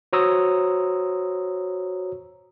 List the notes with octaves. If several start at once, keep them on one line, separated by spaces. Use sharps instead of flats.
F#4 C5 C#5 A#5 D#6 E6